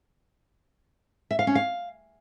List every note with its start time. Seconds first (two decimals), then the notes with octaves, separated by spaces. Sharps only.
1.31 E5
1.39 F5
1.47 C#4
1.55 F5